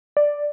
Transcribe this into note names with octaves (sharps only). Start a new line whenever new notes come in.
D5